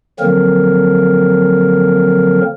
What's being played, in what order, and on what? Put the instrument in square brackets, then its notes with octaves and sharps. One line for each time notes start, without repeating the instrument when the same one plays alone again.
[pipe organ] D3 F3 F#3 A#3 C4 A#4